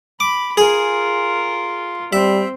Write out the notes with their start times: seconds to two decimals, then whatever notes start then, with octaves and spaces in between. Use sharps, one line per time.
0.20 B5 D6
0.57 F4 G#4 A#4
2.13 G3 C4 E5